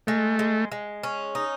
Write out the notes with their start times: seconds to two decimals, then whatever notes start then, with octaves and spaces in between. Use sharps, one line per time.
0.07 G#3 A3
0.39 G#3
0.72 G#3
1.03 C#4
1.35 D#4